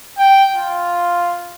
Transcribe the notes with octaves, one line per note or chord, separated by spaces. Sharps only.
G5
F4